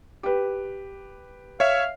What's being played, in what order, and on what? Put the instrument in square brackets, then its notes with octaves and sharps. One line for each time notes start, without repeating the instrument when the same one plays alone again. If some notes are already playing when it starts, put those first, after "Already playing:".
[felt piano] G4 B4
[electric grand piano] C#5 E5 [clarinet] F5